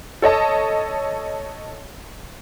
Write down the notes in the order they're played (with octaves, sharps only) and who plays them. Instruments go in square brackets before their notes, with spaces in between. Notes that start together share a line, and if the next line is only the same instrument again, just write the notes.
[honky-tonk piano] A4 C#5 D#5 A5